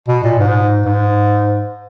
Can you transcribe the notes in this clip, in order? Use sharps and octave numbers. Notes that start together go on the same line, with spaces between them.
B2
A#2
G#2
G#2